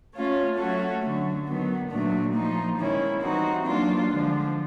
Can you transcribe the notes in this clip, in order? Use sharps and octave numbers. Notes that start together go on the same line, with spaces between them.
A3 C#4 F4
F#3 A3 C#4 F#4 A4
D3 F#3 A3
D#3 F#3 B3
A#2 F#3 A3 D4
F3 A#3 D#4
D#3 G#3 C#4 E4
E3 G3 C4 D#4 F#4
F#3 A#3 D4 F4
D3 F3 G#3